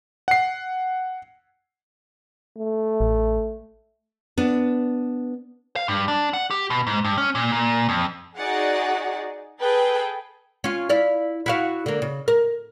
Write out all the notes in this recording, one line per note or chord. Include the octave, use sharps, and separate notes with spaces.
F#5 C7
A3
A1
B3 D4
F5
G2
D4
F#5
G4
B2
G#2
G2
C#4
A#2
A#2
F2
D#4 F#4 G#4 D5 F#5
G#4 A4 B4 G5
C#4 F4
E4 D5 F5
E4 F#4 F5
D3 A#3
C#3
A#4